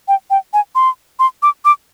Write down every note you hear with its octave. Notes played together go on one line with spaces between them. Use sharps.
G5
G5
G#5
C6
C6
D6
D6